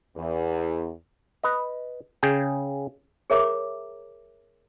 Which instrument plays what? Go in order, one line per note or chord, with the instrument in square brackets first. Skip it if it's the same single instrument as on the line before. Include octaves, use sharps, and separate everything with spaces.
[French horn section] E2
[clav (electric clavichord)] B4 D#5
C#3 G#4 G5
[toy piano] G#4 A#4 C#5 E5 A#5 D6